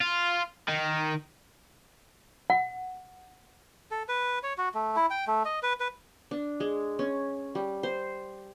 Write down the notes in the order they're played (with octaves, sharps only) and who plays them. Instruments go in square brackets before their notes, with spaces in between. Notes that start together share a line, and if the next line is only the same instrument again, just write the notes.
[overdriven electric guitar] F4
D#3
[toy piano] F#5
[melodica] A4
B4
C#5
F#4
A3
E4
G5
A3
D#5
B4
B4
[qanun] D4
G#3
C#4
G3
C5